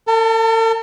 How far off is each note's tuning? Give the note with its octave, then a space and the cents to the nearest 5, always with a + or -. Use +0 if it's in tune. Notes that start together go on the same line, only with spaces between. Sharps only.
A4 +45 A5 +0